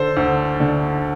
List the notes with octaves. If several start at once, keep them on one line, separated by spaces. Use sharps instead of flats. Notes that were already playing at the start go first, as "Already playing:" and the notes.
Already playing: D3 A4 C5
D2
D3